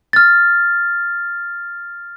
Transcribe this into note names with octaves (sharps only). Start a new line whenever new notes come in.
F6 A6